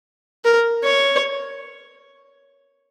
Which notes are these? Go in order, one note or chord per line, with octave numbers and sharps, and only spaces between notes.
A#4
C#5